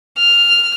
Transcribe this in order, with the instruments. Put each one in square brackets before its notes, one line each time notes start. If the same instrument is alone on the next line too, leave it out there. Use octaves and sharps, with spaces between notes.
[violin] F6